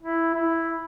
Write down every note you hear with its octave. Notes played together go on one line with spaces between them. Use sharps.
E4
E4